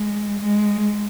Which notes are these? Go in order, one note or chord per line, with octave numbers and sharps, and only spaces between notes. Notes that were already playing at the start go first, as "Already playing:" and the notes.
Already playing: G#3
G#3